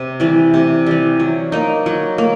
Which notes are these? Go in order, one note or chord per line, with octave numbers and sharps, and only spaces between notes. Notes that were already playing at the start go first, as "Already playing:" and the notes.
Already playing: C3
E3 G3
C3
E3 G3
F#3
A#3 D#4
F#3
A#3